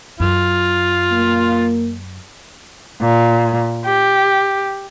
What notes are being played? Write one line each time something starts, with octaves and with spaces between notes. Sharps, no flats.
F#2 F4 F5
A#3
A#2
G4